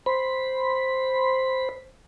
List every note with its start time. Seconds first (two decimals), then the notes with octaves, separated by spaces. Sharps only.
0.06 C5 B5